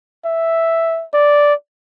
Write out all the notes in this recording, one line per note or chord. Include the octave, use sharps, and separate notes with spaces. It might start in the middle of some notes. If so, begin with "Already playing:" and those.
E5
D5